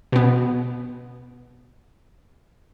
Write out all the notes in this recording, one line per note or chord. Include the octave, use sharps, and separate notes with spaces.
B2 B3